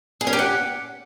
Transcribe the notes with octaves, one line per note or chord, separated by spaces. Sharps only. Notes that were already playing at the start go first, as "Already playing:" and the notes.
G#4
C#4
G4
F#5